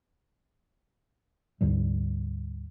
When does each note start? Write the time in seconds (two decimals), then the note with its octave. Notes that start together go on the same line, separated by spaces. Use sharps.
1.61 D2 G#2 D3 G3